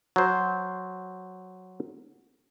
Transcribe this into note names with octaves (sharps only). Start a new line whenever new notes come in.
F#3 C5